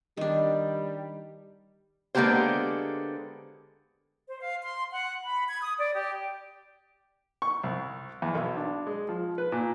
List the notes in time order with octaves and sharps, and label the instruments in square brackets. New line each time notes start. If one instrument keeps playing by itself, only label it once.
[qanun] D#3 D4 [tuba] G3
[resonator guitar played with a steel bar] D3 G#3 A#3 B3 G4 C5
[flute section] C5
F5
C6
F#5
B5
G#6
D#6
D5
G4
[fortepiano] C#6
C2
E2
B1
D4
G#3
F3
B4
A#2